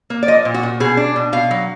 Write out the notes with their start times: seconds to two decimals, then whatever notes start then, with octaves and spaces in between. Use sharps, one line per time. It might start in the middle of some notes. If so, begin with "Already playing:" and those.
0.10 A#3
0.23 D5
0.28 F3 D#5
0.45 A#2
0.54 F#4
0.63 A#2
0.80 B2 G#4
0.97 D4
1.16 B2
1.33 B2 F5
1.51 F#3